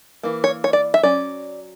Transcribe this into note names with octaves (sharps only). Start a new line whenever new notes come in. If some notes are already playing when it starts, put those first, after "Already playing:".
E3 A#3
C#5
C#5
D5
E5
F#3 C#4 D5